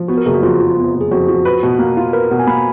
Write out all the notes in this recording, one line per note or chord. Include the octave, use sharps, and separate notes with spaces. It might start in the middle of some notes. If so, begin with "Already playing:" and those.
Already playing: F3
B3 F#4
A#4
F#1 G#4
F#4
F2 F4
F3
B3
F#1
G#4
F2 F#4
F3 F#4
B4
B2
A#3
F4
A#4 B4
B2 F#5
G#5
A#3 B5